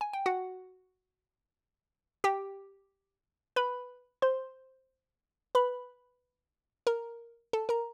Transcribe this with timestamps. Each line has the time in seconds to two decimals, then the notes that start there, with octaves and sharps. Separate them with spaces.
0.01 G#5
0.13 G5
0.26 F#4 F#5
2.24 G4 G5
3.56 B4 B5
4.22 C5 C6
5.55 B4 B5
6.87 A#4 A#5
7.53 A4 A5
7.69 A#4 A#5